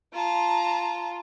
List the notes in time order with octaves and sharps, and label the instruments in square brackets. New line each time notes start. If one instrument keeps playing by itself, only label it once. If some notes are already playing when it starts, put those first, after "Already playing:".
[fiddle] F4 [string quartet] A5 A#5